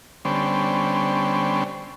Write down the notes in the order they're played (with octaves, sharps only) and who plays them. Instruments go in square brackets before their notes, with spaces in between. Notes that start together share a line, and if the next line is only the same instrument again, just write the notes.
[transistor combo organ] D3 G3 B3 C#4 C5